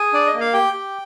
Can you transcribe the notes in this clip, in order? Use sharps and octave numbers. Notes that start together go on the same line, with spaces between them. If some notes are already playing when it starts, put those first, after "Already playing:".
Already playing: G#4 G#5
D4 D5
D#5
A#3
F5
G4 G5
G4